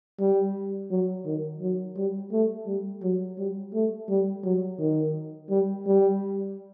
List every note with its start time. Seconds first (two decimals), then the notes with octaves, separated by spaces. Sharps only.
0.20 G3
0.91 F#3
1.25 D#3
1.61 F#3
1.97 G3
2.32 A3
2.67 G3
3.03 F#3
3.38 G3
3.74 A3
4.09 G3
4.44 F#3
4.79 D#3
5.50 G3
5.86 G3